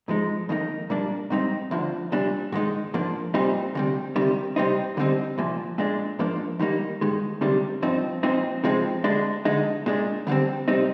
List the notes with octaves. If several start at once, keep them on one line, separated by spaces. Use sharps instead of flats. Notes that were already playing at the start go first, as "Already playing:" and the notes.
G#2 F3 G#3 D#4
F2 D#3 A#3 D#4
A#2 G3 A#3 D4
G#2 G3 C4 D#4
D2 D3 F3
C2 A#2 G3 D4
G#2 D#3 G#3 D#4
G#2 F3 A#3 D4
C2 A#2 G3 C4 D#4
D2 C3 G3
D2 C3 D#3 G3
C3 G3 C4 D#4
D2 D3 G3 C4 D#4
C2 A#2 F3
A#2 G#3 D4
G#2 F3 A#3 D4
D#2 D#3 G3 A#3 D#4
G2 D#3 G#3
D2 C3 D#3 G3 D4
G2 F3 C4 D#4
A#2 F3 C4 D#4
C3 F3 G#3 C4 D#4
D2 D3 G#3 D4
D2 D3 G#3 D#4
A#2 G#3 D4
D2 D3 G3 C4
C3 G3 C4 D#4